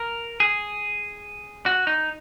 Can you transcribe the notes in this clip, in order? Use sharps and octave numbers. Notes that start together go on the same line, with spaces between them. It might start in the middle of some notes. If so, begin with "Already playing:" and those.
Already playing: A#4
G#4
F#4
D#4